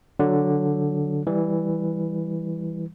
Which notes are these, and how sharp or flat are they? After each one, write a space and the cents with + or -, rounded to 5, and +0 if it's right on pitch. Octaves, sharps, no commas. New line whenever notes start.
D3 +0 F#3 +0
E3 +0 G3 +10